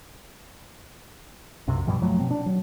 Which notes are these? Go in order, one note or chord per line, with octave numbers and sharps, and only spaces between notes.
B1 F#2 C3
G2 B2 F3 G3
F#1 F3 F#3 A3
B2 C4
D4
F#3